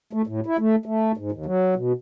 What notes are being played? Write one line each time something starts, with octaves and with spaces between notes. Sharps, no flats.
A3
A2
E4
A3
A3
G#2
D#2
F#3
B2